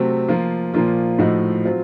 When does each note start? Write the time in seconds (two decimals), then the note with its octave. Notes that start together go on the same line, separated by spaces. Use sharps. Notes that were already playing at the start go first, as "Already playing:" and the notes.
Already playing: C3 F#3 A3 C4
0.29 F3 A#3 F4
0.73 A#2 F3 A#3 F4
1.18 A2 F3 A3 D#4 F#4
1.64 F#3 C4 F4